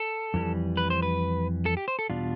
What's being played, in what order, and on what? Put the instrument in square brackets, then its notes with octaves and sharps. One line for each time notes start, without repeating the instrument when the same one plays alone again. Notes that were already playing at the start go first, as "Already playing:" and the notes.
Already playing: [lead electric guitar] A4
[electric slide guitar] F2 E3 G3
[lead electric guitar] B4
C5
B4
A4
G4
C5
A4
[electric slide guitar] E2 B2 G3 D4 F4